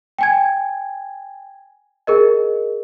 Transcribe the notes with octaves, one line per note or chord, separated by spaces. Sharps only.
G5 G#5 G#6
G#4 A#4 D#5